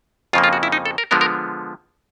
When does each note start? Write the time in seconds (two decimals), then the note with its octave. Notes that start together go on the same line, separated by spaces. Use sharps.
0.33 F2 C#3 F3 A#3 F4
0.44 F4
0.53 F#4
0.63 E4
0.72 D#4
0.85 A4
0.98 A#4
1.11 D3 F3 G#3 B3 A#4
1.21 A#4